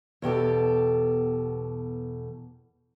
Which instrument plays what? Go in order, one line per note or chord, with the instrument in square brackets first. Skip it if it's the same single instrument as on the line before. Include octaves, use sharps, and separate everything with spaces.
[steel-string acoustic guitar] E2 B2 G4 A4